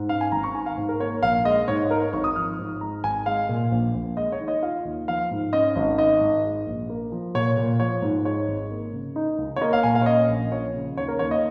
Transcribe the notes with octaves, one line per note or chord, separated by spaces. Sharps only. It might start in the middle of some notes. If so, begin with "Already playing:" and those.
Already playing: G#2
C#4 F5
G#5
G#1 A#5
C#6
D#3 G#5
F5
G#2
A#4
A#3 C#5
A#1 F5
G#3 D#5
G#2 C#5
D#4 A#4
C#5
G#1 C#6
D#6
F3 F6
G#2
G#3 A#5
G#1 G#5
G#3 F5
A#2
A#1
A#1
G#3 D#5
C#5
D#3
D#5
F4 F5
D#2
F3 F5
G#2
C#4 D#5
G#1 D#5
D#3 D#5
G#2
G#3
A#1
A#3
F3
A#2 C#5
A#2
F3 C#5
G#2
G#3 C#5
G#1
A#3
C#3
D#4
C#2
C#5
A#3 D#5
F5
A#2 G#5
F5
C#5
C#4 D#5
A#1
F3 C#5
C#3
D#2 C#5
A#4
D#2 C#5
D#5